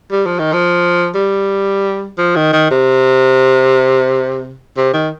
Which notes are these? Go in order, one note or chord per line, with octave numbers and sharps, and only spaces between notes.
G3
F3
D#3
F3
G3
F3
D#3
D#3
C3
C3
D#3